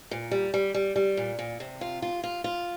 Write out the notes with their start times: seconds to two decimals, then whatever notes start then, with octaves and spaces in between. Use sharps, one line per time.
0.11 A#2
0.31 G3
0.54 G3
0.74 G3
0.96 G3
1.17 A#2
1.39 A#2
1.60 C3
1.81 F4
2.02 F4
2.23 F4
2.44 F4